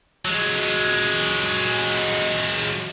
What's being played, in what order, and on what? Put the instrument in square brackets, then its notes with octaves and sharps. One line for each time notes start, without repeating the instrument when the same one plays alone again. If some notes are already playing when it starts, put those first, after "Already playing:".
[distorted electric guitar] F#3 G#3